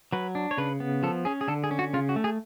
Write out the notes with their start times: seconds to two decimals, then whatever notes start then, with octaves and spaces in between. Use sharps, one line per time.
0.13 F#3 B4
0.35 D4
0.51 C#5
0.58 C#3 B4
0.80 B3
1.03 F3 A4
1.25 C#4 G#4
1.41 G#4
1.48 D3 A4
1.64 G#4
1.71 C#4
1.79 F#4
1.94 C#3 F4
2.09 F#4
2.16 A3
2.24 G#4